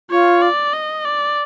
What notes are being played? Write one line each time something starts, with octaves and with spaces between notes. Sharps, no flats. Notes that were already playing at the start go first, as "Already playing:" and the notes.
F4 C#5
D5
D#5
D5